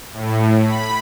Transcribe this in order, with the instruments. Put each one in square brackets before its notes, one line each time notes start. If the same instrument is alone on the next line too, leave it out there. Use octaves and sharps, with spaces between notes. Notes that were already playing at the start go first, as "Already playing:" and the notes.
[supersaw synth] A2
B5